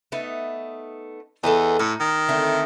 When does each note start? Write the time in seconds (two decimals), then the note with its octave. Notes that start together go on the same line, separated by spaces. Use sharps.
0.12 A3 B3 D#4
1.43 E2 A4 B4 D#5
1.79 A2 D#4
2.00 D#3
2.29 D3 A3 C4